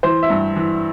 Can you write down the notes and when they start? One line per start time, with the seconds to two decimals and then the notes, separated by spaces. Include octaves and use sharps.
0.03 E3 C5
0.23 E5
0.30 G2
0.56 E3